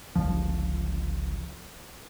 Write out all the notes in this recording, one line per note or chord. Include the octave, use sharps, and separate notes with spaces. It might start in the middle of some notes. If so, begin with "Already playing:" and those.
G1 C#2 F3